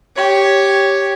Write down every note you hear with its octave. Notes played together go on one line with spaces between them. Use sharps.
G4 C#5